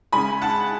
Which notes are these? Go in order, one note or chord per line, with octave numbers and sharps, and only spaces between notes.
C#2 C#3 G#3 G#5 B5
F#5 A5